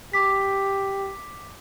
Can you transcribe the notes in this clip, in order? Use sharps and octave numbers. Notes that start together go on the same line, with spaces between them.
G4 D6 B6